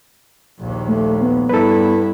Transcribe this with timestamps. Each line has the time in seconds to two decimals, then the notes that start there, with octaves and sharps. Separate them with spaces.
0.59 A#1 D#2
0.88 A3
1.21 B3
1.49 G2 E4 A4 B4